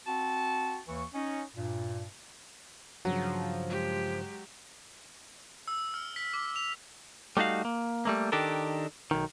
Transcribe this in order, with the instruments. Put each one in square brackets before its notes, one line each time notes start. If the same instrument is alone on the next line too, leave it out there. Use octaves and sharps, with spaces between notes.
[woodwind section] C4 F#4 G5 A5
D#2 E3 C#6
C#4 D#4
G2 A#2
[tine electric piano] G2 C#3 [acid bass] F3 [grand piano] F#3
[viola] G#3 G4
[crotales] E6
F6
B6
D6
F7
[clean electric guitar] G3 A3 D#4 F#4 F5
A#3
G3 A3 A#3
D#3 D4 G4 A4 A#4
B1 D#3